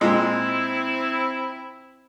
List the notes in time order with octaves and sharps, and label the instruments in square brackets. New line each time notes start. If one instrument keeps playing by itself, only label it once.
[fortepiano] A#2 G#3 [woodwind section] C4 E4